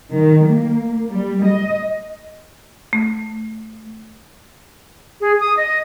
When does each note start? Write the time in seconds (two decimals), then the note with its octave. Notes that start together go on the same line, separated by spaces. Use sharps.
0.13 D#3
0.47 A#3
1.09 G3
1.44 D#5
2.93 A3
5.21 G#4
5.40 D#6
5.57 D#5